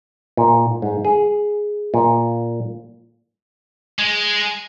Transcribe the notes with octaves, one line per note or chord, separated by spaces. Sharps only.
A#2
G#2
G#4
A#2
G#3